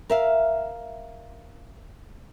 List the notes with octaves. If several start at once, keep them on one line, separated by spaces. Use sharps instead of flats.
A#4 E5 F5